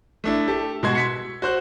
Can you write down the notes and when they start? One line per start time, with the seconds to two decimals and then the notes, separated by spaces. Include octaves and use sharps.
0.24 A3 D4 E4
0.47 G4 A4
0.83 B2 G#3 F#4 C6 G#6
0.95 G#6 B6 C#7
1.42 F#4 C5 F#6